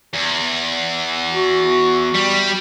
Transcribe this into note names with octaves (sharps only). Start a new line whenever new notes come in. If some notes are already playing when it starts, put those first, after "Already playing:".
E2
F#4
G3